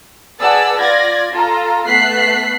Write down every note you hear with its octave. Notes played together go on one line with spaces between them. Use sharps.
G#4 B4 D5 F#5 A5 E6
F4 D5 G#6 A#6
F4 A4 A#5
A3 B3 F#6 B6 C7